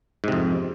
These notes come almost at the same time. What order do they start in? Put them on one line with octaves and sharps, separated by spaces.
G#2 C3 F2